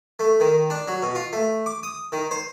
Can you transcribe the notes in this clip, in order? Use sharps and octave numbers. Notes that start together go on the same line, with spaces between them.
A3
D#3
D4
F#3
B2
F4
A3
D6
D#6
D#3
C5